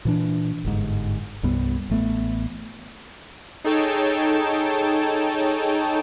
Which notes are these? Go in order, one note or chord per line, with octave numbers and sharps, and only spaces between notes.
A#2 E3 D4
G1 G#2
C2 G2 G3 B3
A1 A3 B3
D#4 G#4 A4 C#5 G5 A5